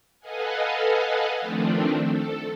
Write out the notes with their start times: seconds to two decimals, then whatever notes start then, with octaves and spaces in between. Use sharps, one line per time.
0.20 A4 B4 D#5 F5 F#5 G#5
1.41 D#3 F3 A3 C4 D4
2.04 A4